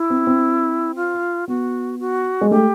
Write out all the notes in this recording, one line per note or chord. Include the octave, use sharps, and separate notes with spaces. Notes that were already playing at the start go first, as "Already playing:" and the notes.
Already playing: E4
C4
C4
F4
B3 F#4
F#4
G#3
A3 G4